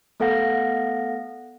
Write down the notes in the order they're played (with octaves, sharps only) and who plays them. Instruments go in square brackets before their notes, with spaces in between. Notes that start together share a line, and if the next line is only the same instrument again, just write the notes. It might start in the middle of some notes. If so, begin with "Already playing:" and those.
[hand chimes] A3 B3 A4 F5 F#5 A#6